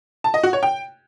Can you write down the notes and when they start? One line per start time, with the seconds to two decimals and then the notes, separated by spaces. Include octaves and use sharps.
0.24 A5
0.34 D#5
0.43 F#4
0.53 C#5
0.63 G5